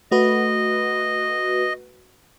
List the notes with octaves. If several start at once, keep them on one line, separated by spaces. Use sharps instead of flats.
A3 F#4 B4 D#5